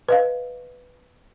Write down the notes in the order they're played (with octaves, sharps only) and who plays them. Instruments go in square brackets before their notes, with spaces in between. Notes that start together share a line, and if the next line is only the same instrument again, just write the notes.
[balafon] B4 D#5 F5